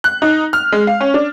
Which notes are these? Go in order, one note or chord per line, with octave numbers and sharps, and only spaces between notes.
F#6
D#4
F6
G#3
F5
C#4
D4